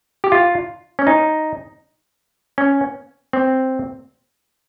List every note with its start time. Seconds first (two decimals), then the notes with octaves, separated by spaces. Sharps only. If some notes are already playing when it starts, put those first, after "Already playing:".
0.24 G4
0.32 F4
0.99 C#4
1.07 D#4
2.58 C#4
3.33 C4